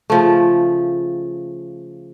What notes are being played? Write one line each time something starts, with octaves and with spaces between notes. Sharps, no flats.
C#3 F3 A3